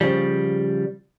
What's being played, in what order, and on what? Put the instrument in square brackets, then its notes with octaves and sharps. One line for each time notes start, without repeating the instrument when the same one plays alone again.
[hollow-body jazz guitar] C#3 F3 G3